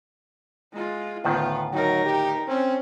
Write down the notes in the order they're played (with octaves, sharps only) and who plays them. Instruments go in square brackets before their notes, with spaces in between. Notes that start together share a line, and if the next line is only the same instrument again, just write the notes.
[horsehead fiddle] G#3 F4
[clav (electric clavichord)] D2 A2 D#3 [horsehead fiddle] B3 F4
[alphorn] F#3 [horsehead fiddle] D#4 A#4
[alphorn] G4
[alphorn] C4 [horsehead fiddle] C#4